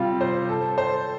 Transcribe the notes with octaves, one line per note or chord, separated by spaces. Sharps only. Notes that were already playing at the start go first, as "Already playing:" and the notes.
Already playing: C3 G3 F4
C5
A4
C5